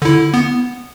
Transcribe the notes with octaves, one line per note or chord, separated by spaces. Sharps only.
D3 E4
B3